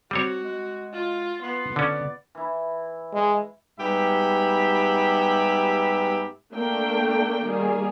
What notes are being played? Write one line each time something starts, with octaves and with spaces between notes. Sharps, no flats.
G3 C4 F#4 C#5
G#3
F4
B3 C6
D3 C#4 D5
E3 E4
G#3
G#2 G3 B3 G4 E5 B5
A3 A#3 D4 G5
D#3 G3 A#3 G#4